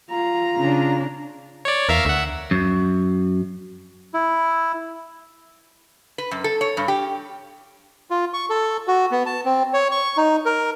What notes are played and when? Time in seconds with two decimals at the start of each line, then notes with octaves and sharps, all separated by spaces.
0.10 F4 A#5
0.58 C#3 D4
1.65 C#5 D5
1.89 E2 A#4 E5 F5
2.05 D2 E5 F#5
2.51 F#2
4.14 E4
6.18 B4
6.31 F#2
6.44 A4
6.61 C#5
6.77 G2
6.88 G4
8.10 F4
8.34 C#6
8.50 A4
8.88 F#4
9.11 B3
9.26 A5
9.45 C4
9.74 C#5
9.91 C#6
10.17 D#4
10.46 A#4